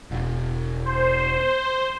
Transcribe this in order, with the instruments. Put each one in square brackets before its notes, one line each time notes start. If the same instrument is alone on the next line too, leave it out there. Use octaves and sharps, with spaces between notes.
[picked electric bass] E1
[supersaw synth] C5